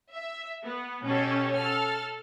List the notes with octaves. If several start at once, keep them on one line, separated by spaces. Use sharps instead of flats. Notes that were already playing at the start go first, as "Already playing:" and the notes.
E5
B3
B2 C#4 G4 A4
A4 F6